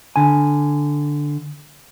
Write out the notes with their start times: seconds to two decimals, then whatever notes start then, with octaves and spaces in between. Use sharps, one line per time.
0.16 D3 G#5